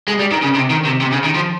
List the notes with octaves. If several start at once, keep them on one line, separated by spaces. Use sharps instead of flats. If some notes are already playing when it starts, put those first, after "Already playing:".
G#3
G3
D#3
C#3
C3
D#3
C3
C3
C#3
D#3
F3